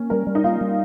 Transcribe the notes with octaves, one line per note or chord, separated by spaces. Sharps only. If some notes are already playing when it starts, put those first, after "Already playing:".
Already playing: A#3 C#4
G3 A#4
G3
D#4
A#3 F4
G3